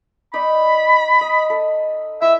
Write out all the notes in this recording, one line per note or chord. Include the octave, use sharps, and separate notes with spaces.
D#4 D5 B5
D#5
A4 D#5
E4 E5